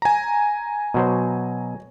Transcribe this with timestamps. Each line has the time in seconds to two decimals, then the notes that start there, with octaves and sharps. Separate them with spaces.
0.02 G#5 A#5
0.94 B2 F#3 C5